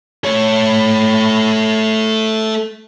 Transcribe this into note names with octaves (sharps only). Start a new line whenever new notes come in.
A3 C#5